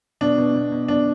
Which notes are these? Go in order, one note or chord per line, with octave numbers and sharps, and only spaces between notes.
B2 D4
B2
B2
B2
B2 D4